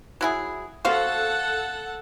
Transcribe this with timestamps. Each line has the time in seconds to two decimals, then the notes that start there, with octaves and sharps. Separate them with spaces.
0.21 F#3 E4 G#4
0.85 F#4 A4 C5 F5 F#5